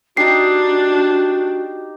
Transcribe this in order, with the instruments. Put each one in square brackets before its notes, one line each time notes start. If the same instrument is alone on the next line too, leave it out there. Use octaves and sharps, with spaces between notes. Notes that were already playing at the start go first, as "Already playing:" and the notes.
[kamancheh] D4 [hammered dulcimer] D#4 G4 [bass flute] F#4 [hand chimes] C7